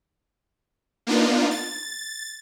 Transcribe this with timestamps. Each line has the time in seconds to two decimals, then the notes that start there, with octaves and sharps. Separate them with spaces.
1.07 A#3 B3 D4 D#4 F4
1.51 A6